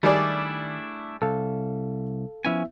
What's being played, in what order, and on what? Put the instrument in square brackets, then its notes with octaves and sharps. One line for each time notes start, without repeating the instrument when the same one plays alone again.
[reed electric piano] D#3 [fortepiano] G3 G#4 D5 [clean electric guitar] A3 D4 E4
[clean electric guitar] C2 [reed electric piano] A4 F5
[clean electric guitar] F3 C#4 G#5 [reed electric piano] B3 E4 E5